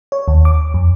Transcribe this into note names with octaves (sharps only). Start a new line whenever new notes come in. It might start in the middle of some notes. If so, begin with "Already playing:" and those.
C#5
D#2
D6
F2